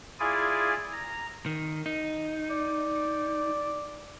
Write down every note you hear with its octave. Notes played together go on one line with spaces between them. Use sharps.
E4 F4 G#4 D5 G#5
A#5
D#3
D#4
D5